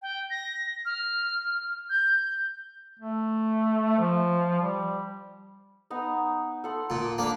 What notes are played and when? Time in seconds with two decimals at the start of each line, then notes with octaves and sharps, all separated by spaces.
0.02 G5
0.31 A#6
0.85 F6
1.90 G6
3.00 A3
3.99 F3
4.62 G3
5.90 B3 D#4 A#5
6.64 A4 F#5 C6
6.90 A#2
7.18 A#3 D4 B5